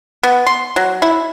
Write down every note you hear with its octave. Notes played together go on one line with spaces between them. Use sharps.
B3
C6
F#3
E4